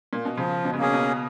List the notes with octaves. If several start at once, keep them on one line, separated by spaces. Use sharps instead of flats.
A#2
B2
C#3 F3
B2
C#3
B2 A#3 C#4 G#4
B2